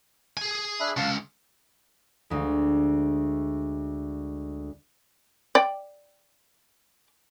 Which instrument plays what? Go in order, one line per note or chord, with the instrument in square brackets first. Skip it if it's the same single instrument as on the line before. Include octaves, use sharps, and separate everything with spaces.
[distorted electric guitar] G#4 G#5
[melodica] D4 E5 B5
[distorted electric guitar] C#2 [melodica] F5 F#5 A5
[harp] D2 G#3
[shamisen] D5 G5